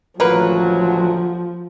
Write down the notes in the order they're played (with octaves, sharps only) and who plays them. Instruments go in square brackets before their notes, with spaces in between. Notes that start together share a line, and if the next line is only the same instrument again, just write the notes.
[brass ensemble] A1 D2 F#3 [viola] F3 [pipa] A#3 A#4 B4